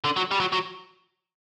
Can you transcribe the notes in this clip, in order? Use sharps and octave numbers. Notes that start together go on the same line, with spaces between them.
D3
F#3
G3
F#3
F#3